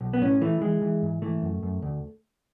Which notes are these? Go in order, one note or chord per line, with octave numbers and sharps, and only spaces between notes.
B1
B3
A2 C#4
E3 A3
E3 G#3
E3
G#2
E3 A3
F#2
F#2
D2